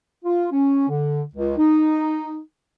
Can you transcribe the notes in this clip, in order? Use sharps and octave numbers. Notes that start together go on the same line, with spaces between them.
F4
C#4
D3
C#2
D#4